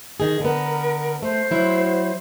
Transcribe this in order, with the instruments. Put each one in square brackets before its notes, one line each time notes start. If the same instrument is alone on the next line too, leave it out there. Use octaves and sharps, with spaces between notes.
[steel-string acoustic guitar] D#3 G#4
[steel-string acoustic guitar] D3 B3 [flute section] A#4
[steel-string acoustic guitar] A3 [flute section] C5
[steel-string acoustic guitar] F#3 E4 F#4